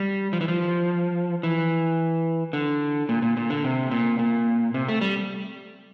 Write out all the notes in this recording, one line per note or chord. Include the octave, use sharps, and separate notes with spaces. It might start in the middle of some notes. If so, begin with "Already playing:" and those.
Already playing: G3
F3
E3
F3
E3
D3
A#2
A#2
A#2
D3
C3
A#2
A#2
C3
A3
G3